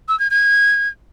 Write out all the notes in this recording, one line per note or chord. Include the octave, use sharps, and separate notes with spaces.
E6
G#6
G#6